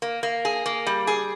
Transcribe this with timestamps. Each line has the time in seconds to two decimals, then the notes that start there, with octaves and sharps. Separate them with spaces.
0.02 A#3
0.23 A#3
0.45 G#4
0.66 A#3
0.87 G3
1.07 G#4